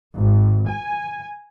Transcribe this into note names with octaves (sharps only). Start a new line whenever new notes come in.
G#1
G#5